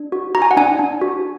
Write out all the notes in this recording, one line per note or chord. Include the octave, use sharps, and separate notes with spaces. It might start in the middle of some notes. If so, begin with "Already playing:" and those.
Already playing: D4
F#4
F#4 A#5
G#5
F#5
D4 G#5
D4
F#4